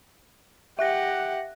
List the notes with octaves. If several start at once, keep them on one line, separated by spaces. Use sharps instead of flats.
G4 E5 F#5 F#6 A#6